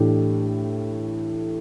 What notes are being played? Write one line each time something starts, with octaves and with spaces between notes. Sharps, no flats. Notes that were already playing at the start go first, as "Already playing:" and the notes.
Already playing: A2 E3 A3 D4 G4